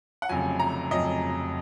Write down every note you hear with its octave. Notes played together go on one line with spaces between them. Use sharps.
F#5
F1 F2 C#3 F#3 G#5
A#5
F1 F2 C#3 F#3 D#5